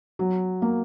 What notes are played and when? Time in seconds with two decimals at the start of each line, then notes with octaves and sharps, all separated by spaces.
0.19 F#3
0.62 A#3